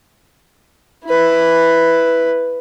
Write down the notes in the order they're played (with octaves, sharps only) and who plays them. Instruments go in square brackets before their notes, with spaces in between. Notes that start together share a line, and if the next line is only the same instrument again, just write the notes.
[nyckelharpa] E4 B4